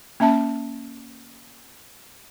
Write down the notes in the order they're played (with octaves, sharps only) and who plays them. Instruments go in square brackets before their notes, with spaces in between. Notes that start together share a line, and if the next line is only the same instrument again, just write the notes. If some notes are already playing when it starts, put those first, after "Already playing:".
[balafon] A#3 C#4 E5 A5